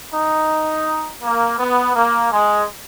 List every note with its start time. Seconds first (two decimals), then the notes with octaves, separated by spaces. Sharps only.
0.13 D#4
1.22 A#3
1.59 B3
1.96 A#3
2.31 G#3